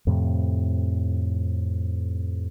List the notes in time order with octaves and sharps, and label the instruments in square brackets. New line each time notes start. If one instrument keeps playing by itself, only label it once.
[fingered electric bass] F2 A2 C3